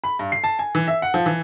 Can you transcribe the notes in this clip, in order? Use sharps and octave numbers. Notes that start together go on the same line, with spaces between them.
B5
G2
C7
A5
G#5
E3
E5
F#5
F3
E3